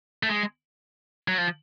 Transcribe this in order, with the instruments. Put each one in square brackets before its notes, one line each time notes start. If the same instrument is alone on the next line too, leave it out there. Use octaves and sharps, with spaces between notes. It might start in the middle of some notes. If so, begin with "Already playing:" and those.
[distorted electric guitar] A3
G#3
F#3
F3